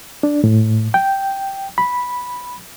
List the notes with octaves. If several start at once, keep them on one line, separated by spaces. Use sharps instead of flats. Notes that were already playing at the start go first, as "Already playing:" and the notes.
D4
A2
G5
B5